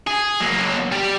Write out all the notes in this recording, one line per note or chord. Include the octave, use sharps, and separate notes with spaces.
G#4
F#3 A#3
G3 G4